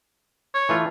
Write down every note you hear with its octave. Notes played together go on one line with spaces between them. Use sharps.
C#5
E3 A3 F4